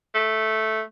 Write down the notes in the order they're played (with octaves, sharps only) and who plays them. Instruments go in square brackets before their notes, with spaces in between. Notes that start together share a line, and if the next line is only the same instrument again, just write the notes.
[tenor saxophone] A3